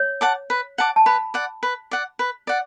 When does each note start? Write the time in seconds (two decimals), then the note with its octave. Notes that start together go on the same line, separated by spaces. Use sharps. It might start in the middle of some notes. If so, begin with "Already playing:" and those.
Already playing: C#5
0.21 F#5 A5 D6
0.50 B4
0.78 F#5 A5 D6
0.96 A5
1.06 B4 B5
1.34 D5 F#5
1.63 B4
1.91 D5 F#5
2.19 B4
2.47 D5 F#5